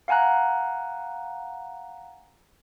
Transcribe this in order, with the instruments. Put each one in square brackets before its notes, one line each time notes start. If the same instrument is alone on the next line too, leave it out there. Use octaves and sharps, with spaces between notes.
[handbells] F5 F#5 G#5 A#5 F#6